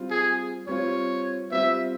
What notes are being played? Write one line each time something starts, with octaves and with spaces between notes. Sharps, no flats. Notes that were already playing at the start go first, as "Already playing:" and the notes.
Already playing: G3 C4 F4
G#4
G3 C4 F4 C#5
G3 C4 F4 E5